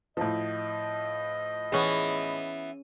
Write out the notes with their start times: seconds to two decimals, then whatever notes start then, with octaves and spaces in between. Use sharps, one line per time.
0.17 A2 F3 D#5
1.72 E3 B3 C#4 G#4